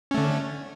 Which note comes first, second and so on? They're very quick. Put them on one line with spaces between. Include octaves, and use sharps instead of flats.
C#4 A3 D3